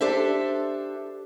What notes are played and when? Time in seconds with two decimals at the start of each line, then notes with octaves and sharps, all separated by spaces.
0.01 D4 G4 A4 C5 E5